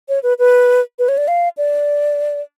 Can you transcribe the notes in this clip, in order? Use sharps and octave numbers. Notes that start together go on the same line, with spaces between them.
C#5
B4
B4
B4
C#5
D5
F5
D5